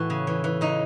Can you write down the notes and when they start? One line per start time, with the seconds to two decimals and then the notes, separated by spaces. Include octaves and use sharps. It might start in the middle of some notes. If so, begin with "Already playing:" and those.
Already playing: A2 E3 F#4 A4
0.10 C#3
0.27 E3
0.44 E3
0.61 C#3 D#4